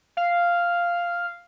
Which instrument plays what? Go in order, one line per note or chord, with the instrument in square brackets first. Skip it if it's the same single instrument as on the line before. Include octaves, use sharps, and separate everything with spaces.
[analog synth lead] F5